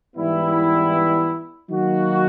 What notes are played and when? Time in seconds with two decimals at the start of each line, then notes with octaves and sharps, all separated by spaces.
0.16 G#2 E3 G3 B3 E4
1.70 D#3 F#3 A#3 D#4 F#4